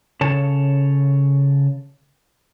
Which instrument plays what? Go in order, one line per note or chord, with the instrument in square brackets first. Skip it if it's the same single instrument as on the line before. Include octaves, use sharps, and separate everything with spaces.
[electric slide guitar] C#3 A4 C#5 A5